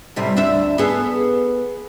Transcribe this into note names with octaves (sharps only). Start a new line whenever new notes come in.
A2 C3 G3
D2 D4 E5
B3 G#4 A4